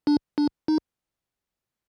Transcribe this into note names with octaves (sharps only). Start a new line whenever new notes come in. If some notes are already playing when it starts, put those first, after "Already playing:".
D4
D4
D#4